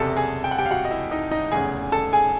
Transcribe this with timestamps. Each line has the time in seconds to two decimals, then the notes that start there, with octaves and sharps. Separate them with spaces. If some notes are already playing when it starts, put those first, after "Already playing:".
Already playing: F#1 E2 C3 A4 A5
0.16 G#4 G#5
0.44 G5
0.51 F#5
0.58 G4 G5
0.66 F5
0.71 F#4 F#5
0.85 D#5
0.91 E4 E5
1.11 D#4 D#5
1.31 D#4 D#5
1.52 F1 E2 C#3 G#4 G#5
1.92 A4 A5
2.13 G#4 G#5